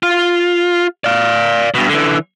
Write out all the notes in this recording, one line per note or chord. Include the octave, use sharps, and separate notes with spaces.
F4
D5 F5
G2 B2
D3 E3